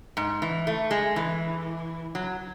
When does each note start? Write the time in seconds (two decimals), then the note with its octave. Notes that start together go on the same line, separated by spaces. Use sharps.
0.17 G#2
0.42 E3
0.67 A3
0.91 G#3
1.16 E3
2.15 F#3